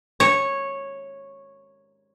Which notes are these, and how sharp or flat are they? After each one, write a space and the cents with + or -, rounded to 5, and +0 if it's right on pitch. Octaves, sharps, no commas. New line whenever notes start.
C#5 -10